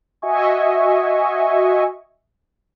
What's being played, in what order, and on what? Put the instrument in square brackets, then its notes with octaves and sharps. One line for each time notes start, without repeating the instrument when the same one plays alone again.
[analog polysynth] F#4 D#5 E5 G#5 C#6